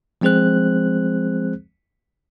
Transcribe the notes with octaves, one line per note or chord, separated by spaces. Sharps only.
F3 G#3 C4 G#4 C5 F#6